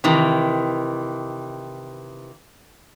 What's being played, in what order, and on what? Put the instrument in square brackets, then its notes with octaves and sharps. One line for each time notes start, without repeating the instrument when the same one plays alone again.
[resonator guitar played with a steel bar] C3 D#3 E3